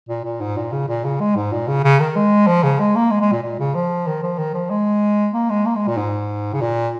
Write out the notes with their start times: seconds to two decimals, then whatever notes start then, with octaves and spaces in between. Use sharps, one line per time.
0.09 A#2
0.24 A#2
0.41 G#2
0.57 A#2
0.72 C#3
0.88 A#2
1.04 C#3
1.21 G#3
1.36 G#2
1.52 A#2
1.68 C#3
1.84 C#3
2.00 D#3
2.16 G#3
2.47 F3
2.63 C#3
2.80 G#3
2.96 A#3
3.11 G#3
3.21 G#3
3.32 A#2
3.43 A#2
3.59 C#3
3.75 F3
4.07 D#3
4.23 F3
4.38 D#3
4.54 F3
4.71 G#3
5.34 A#3
5.50 G#3
5.66 A#3
5.76 G#3
5.88 A#2
5.98 G#2
6.54 C#3
6.61 A#2